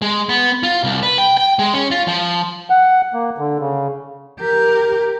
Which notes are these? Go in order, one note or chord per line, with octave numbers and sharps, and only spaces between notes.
G#3
B3
F4
C2
B4
G5
G5
G#3
C#4
F4
F3
F#5
A#3
D3
C#3
G4 A#4